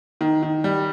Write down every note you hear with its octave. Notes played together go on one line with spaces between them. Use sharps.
D#3
D#3
G3